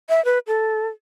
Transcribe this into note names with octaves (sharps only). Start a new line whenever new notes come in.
E5
B4
A4